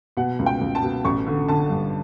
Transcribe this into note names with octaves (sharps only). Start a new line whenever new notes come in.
B2 F#5
C#2
G5
C#2
A5
B2
A1 C#6
D3
D3 A5
G2